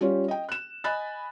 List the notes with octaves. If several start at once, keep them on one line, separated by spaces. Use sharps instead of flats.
G3 C#4 F4 G4 C#5
D#5 G5
F#6 E7
D#5 G#5 B5 F#6 A6